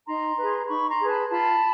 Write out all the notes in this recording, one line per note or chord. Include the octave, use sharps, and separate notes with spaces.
D#4 A#5 C6
G#4 B4
C6
D#4 B5 C#6
A#5 C6
G#4 B4
A5 B5
F4 A5 B5